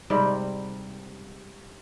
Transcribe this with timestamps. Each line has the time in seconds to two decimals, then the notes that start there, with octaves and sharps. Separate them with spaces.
0.10 G#2 C3 G3 C4